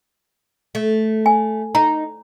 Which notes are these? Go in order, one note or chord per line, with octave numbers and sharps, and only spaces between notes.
A3
G#5
D#4 A#5